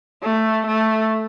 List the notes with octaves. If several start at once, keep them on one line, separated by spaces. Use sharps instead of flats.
A3
A3